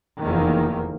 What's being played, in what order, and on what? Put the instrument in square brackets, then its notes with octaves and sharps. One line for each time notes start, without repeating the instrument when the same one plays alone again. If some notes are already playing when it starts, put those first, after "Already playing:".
[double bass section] F1 E2 D#3 A#3